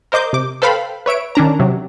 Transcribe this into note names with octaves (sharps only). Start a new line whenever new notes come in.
A#4 C5 D#5 D6 G6
C3 D6
A4 B4 C5 F5 G5 B5
B4 C#5 E5 D7
D#3 C#4 D4 A#5
C3 F#3